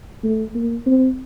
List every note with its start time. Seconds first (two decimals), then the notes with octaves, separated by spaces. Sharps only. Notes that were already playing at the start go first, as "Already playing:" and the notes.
0.24 A3
0.55 A#3
0.86 C4